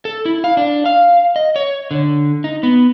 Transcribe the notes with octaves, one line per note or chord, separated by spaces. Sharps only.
A4
E4
F5
D4
F5
D#5
C#5
D3
D#4
B3